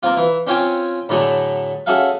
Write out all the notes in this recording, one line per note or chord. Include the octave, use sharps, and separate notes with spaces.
A#3 C4 F4
E3
C4 C#4 F4 C#5 G5 G#5
A2 D3 F#3 A3 G#4
C#4 F#4 G#4 A4 E5 F5